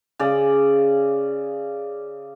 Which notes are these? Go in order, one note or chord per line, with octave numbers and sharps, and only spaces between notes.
C#3 D5